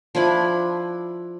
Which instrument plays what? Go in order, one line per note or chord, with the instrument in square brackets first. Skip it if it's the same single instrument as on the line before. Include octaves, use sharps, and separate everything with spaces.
[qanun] F3 D4 E4 B5